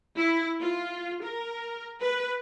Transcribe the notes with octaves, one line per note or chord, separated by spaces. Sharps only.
E4
F4
A#4
B4